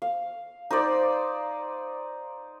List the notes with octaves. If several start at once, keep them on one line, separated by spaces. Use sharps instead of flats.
F5
D#4 C5 D5